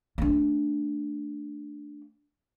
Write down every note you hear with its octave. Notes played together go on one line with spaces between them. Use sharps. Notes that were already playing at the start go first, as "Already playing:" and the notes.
A3 D4